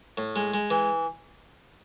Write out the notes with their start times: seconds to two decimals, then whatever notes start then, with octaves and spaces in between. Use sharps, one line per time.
0.18 A2
0.36 G#3
0.54 G#3
0.70 E3